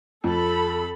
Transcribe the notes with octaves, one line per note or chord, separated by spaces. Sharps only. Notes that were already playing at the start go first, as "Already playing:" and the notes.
F2 A4 B5